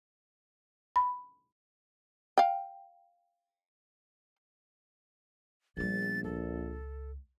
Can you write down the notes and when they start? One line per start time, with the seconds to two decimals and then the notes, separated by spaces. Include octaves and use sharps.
0.96 B5
2.38 F5 G5
5.77 A#1 G3 B3 A6
6.24 C#2 A4